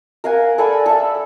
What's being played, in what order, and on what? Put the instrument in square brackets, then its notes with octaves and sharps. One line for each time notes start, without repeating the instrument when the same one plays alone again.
[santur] A#4 F5 F#5 G#5
A4 D5 G#5 B5
A4 E5